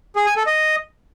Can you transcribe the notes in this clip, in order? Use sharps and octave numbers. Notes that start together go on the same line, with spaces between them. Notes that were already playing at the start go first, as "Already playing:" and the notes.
G#4
G#5
A4
D#5